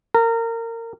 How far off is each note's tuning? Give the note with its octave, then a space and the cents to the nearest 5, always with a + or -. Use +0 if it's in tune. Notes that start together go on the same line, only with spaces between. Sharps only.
A#4 -25